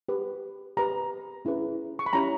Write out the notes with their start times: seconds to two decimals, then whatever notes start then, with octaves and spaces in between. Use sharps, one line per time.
0.09 G4 B4
0.77 G4 B4 A#5
1.45 C#4 E4 G#4 B4
1.99 C#6
2.06 B5
2.13 C#4 E4 G4 C#5 A#5